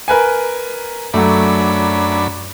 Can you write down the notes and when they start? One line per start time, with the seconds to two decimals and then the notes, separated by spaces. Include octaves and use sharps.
0.08 A#4 B4 G#5
1.14 F#2 F#3 A3 D4 B5